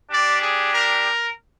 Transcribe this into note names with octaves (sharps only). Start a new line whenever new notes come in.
G3 D4 G4 D5
G#4
A#4